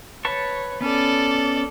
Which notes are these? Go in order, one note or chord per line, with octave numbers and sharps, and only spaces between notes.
B4 C#5 A5 C#6
B3 C#4 A4 D5